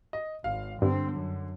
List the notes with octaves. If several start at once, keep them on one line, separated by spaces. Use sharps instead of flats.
D#5
G#1 F5
G2 D3 C4
F#2